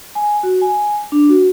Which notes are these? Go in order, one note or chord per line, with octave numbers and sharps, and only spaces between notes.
G#5
F#4
G#5
D4
F#4